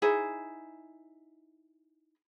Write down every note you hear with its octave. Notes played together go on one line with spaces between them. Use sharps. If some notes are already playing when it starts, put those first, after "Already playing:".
D#4 E4 G#4 C5